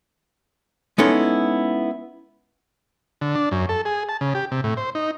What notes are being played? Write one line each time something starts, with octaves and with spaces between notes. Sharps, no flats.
G#3 B3 C#4 D#4 E4 A4
D3
D4
F#2
A4
G#4
A5
C#3
G4
C3
A2
C5
D#4